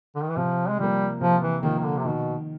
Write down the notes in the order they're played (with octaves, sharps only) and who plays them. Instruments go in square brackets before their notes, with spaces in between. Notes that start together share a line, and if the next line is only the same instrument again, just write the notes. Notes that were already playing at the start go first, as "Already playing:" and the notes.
[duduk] D3
D#3
E3
[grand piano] C3 [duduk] F3
[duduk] G#3
[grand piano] F3 A#3 [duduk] G3
[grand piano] C3 [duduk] F3
[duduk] E3
[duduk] D#3 [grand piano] F3 A#3
[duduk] D#3
D3
C3
[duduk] B2 [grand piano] D#3